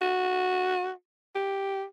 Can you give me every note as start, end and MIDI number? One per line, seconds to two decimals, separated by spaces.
0.01 0.91 66
1.35 1.84 67